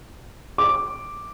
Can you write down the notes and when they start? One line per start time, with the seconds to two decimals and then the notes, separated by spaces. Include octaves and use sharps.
0.58 D6